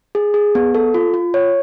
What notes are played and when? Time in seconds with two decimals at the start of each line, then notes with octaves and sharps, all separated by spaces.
0.15 G#4
0.34 G#4
0.55 B3
0.75 A4
0.94 F4
1.14 F4
1.34 C#5